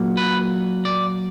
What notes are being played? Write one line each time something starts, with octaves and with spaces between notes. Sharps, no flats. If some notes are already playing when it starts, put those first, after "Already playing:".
Already playing: A#2 F#3 A#3
B4
D5